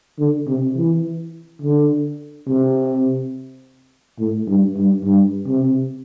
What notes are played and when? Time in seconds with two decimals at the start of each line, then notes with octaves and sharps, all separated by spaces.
0.18 D3
0.47 C3
0.76 E3
1.62 D3
2.47 C3
4.19 A2
4.47 G2
4.77 G2
5.04 G2
5.47 C3